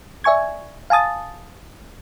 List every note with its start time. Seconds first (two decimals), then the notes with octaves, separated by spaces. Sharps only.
0.24 D5 E5 G#5 C#6 G#6
0.90 F5 G#5 A5 D#6 A6